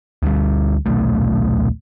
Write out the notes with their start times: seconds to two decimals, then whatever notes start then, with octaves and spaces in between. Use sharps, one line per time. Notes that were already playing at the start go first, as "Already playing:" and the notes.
0.23 D2 G3
0.86 D#1 B1 A3